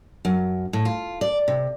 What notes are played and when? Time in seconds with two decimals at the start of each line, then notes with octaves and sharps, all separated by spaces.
0.25 F#2
0.73 A2
0.85 F4
1.21 D5
1.48 C3